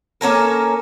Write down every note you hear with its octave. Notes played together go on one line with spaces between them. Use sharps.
A#3 C#4 A4 A#4